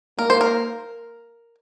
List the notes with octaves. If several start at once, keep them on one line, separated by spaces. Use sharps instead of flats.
A#3 A#4
C5
A#4